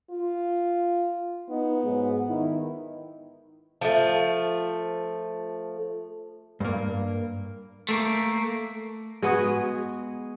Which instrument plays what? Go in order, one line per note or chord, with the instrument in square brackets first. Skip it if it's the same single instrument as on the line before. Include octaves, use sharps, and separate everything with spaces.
[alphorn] F4
[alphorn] B3 [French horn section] D#4
[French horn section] G#2 F#3 G#3
D#3 E4
[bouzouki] F3 A3
[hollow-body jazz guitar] G2 A#3
[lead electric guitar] A3 A#3
[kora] G#3 B3 F#4 G#4